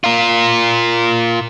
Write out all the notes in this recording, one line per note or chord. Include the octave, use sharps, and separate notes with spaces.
F4 A#4